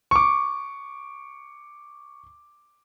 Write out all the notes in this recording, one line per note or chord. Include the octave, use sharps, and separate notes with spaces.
C#6 D6